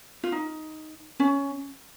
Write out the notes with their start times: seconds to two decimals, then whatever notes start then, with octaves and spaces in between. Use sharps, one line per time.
0.24 F4
0.32 D#4
1.20 C#4